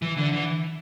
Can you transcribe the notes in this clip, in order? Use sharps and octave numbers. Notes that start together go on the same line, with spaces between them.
E3
D3
E3